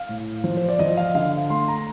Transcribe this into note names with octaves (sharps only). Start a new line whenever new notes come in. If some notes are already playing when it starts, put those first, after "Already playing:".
Already playing: F5
A2
F3
C5
D5
F3 D#5
F5
D3 F5
A3 C6
A#5